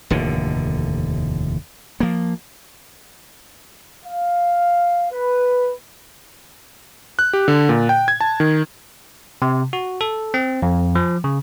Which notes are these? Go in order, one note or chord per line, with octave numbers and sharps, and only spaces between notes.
F1 D#2 A2 D3
F3 A#3
F5
B4
F#6
G4
D3
A#2
G5
G#6
A5
D#3
C3
F#4
A4
C4
F2
F3
C#3